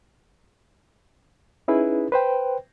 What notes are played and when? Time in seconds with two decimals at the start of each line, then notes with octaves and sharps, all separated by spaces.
1.68 C#4 D#4 E4 G#4 B4
2.12 B4 C5 G5